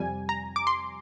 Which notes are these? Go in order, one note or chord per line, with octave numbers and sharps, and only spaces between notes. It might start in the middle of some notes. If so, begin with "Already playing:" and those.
Already playing: F2 C3 G3 G#5
A#5
D6
C6